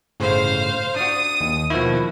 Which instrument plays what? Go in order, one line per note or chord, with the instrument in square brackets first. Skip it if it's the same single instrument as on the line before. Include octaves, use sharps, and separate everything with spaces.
[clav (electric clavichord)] G1 A2 C#3 [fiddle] C5 F5
[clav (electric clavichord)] D4 F#4 [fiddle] D#6
[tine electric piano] D#2
[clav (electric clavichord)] B2 D#3 [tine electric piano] F3 E4 [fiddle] F#4